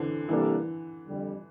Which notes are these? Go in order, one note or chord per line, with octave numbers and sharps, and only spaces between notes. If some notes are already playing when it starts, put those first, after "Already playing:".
Already playing: D3 E3 C4
C3 E3 G3 A#3 D4 A4
F2 D3 G3